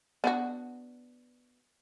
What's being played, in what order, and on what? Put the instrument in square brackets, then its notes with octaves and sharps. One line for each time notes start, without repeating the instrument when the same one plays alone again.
[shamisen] B3 D4 F#4